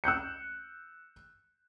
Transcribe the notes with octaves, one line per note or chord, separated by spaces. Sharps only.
E6 F#6 G6 C#7